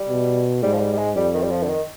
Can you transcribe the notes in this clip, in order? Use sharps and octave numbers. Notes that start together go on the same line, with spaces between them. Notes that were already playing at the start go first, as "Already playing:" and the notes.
Already playing: G3
B2
G#2 G3
F3
G3
G3
G#3
F2 G3
D#3
G3
F3
D3
D#3